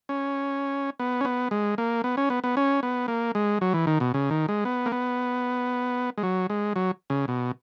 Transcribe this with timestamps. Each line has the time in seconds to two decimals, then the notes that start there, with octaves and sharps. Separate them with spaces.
0.09 C#4
0.99 B3
1.21 C#4
1.25 B3
1.51 G#3
1.78 A#3
2.04 B3
2.17 C#4
2.30 B3
2.44 B3
2.57 C#4
2.83 B3
3.08 A#3
3.35 G#3
3.61 F#3
3.74 E3
3.87 D#3
4.00 B2
4.14 C#3
4.30 D#3
4.48 G#3
4.65 B3
4.86 A#3
4.92 B3
6.18 G#3
6.23 F#3
6.50 G#3
6.76 F#3
7.10 C#3
7.28 B2